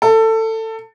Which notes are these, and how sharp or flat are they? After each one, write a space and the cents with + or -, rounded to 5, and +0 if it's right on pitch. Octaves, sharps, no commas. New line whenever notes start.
A4 +20